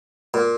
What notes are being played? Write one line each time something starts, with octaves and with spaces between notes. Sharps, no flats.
A#2